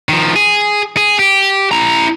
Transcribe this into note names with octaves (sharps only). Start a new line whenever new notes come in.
D#3 F3
G#4
G#4
G4
E4 A#5